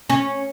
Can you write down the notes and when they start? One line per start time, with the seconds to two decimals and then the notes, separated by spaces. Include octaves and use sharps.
0.10 C#4